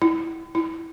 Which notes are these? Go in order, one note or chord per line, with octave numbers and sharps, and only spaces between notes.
E4
E4